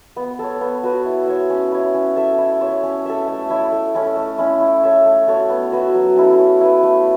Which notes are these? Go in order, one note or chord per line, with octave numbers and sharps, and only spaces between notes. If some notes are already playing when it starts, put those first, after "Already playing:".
B3
A4 C#5
B3
F#4 B4
E4
C#5 E5
C#4
E4 C#5
C#4
A4 E5
E4
C#5 E5
C#4
A4 E5
A3
E4 C#5 E5
A3
C#4 E4 A4
A3
C#4 E4
E4
A4 C#5 E5
A3
F#4 A4 C#5
B3
F#4 B4 E5
F#3
C#4 E4 A4
C#4
E4 B4
A3